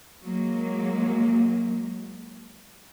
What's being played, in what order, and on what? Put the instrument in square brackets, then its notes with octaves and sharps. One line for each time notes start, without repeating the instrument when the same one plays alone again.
[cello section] F#3 G#3 A#3